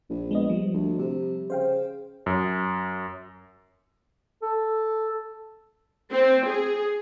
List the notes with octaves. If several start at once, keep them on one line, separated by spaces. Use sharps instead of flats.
A#1
G#3 B3 D#5
F3 G3
D2
C3
C#3 C5 F5 G5
F#2
A4
C4
G#4